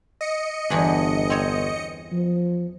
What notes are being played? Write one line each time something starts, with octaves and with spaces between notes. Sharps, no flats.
D#5 C#7
G1 E2 E3 D4
C4 C#5
F3